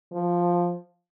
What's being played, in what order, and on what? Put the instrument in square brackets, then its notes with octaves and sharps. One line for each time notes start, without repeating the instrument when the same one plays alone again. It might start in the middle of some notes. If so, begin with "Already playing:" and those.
[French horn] F3